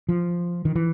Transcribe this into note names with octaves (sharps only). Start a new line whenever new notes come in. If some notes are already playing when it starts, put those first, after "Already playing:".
F3
D#3
E3